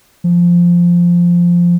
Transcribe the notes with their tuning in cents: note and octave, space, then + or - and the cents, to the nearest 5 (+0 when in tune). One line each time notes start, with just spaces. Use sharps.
F3 -5